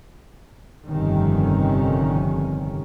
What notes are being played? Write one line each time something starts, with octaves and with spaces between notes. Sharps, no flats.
G1 F2 C3 D#3 C#4